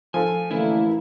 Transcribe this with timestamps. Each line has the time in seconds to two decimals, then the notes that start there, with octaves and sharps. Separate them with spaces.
0.14 F3 A4 G#5
0.51 A1 D3 A3 A#3 E4